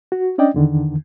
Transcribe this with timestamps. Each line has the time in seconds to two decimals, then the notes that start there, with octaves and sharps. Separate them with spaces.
0.12 F#4
0.38 C#4 D4 D5 D#5 G5
0.54 E2 D3 D#3